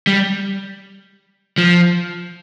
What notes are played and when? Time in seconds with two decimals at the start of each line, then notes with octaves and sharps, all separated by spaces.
0.07 G3
1.58 F3